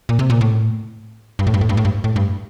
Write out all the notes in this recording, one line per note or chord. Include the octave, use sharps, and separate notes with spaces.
A#2
C3
A#2
A2
G2
A2
G2
A2
G2
A2
G2
A2
G2